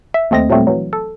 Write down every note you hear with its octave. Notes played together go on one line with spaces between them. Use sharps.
E5
D#2 A3 C4 D#5 A#6
A#2 F#3 G3 A3 C4
E3 F#3
A4